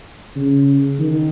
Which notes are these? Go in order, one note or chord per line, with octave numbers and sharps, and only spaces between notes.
C#3
D#3